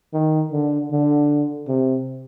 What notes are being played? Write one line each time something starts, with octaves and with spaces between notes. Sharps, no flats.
D#3
D3
D3
C3